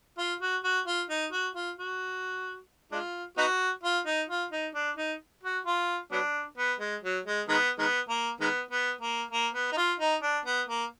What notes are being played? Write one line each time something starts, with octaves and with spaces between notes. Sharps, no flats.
F4
F#4
F#4
F4
D#4
F#4
F4
F#4
G#3 D4 F4
B3 D#4 F#4
F4
D#4
F4
D#4
D4
D#4
F#4
F4
F#3 B3 D4
B3
G#3
F#3
G#3
D#3 G#3 B3
D#3 G#3 B3
A#3
D#3 G#3 B3
B3
A#3
A#3
B3
D#4
F4
D#4
D4
B3
A#3